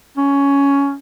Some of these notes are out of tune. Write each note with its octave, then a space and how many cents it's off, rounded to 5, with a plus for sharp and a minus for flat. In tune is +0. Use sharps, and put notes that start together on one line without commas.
C#4 +10